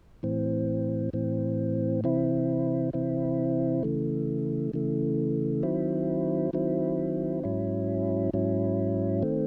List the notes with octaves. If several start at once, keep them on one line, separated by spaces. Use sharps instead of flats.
A2 E3 C4
A2 E3 C4
C3 E3 C4 E4
C3 E3 C4 E4
C#3 E3 A3
C#3 E3 A3
D#3 F#3 C4 E4
D#3 F#3 C4 E4
G#2 F#3 C#4 E4
G#2 F#3 C#4 E4
D#3 A3 C4